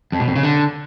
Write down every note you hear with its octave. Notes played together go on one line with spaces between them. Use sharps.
F2
B2
F2
C#3
D3